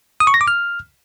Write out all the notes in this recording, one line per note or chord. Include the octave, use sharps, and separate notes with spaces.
D#6
C#6
A#6
D6
F6